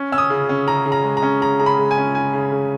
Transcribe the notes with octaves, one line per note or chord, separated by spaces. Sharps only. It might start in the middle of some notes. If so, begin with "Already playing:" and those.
Already playing: C#4
C#4 E6
D#6
C#3
C#4
C#3 A#5
C#3
A#5
G#3
A#5
C#4
C#3 A#5
C#3 A#5
B5
G#3
G#5
C#4
C#3 G#5
C#3
C#3